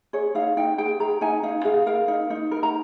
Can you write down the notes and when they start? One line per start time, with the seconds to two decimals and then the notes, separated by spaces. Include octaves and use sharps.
0.13 G#4 C#5
0.35 D#4 F5
0.57 D#4 G5
0.78 G#4 G5
1.00 G#4 A#5
1.21 D#4 G#5
1.43 D#4 F5
1.65 G#4 F5
1.86 A#4 F5
2.08 D#4
2.30 D#4
2.51 A#4
2.63 A#5